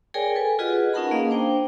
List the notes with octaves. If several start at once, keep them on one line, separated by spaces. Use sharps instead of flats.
G#4 A#4 C#5 D5 G5 G#5
A4 B4 G#5
F4 F#4 G#4 B4 D#5 F#5
C#4 D#4 A#4 F#5 A5 B5
A#3 C#4 G#4 D#5 F5
D4 C5 G5